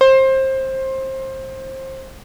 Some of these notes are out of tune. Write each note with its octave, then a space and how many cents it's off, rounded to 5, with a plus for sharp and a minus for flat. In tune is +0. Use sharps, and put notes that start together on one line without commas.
C5 +20